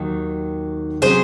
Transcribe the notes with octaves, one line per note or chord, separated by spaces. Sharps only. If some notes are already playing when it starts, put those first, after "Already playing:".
Already playing: D#2 D#3 F#3
C3 F#3 C#4 G#4 C5